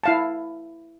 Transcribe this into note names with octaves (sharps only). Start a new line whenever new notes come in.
E4 F5 A5